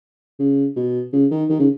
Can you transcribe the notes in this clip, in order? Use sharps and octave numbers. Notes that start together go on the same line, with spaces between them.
C#3
B2
C#3
D#3
D#3
C#3